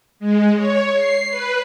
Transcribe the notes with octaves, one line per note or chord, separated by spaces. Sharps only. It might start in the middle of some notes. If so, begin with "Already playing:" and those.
G#3
C#5
C7
B4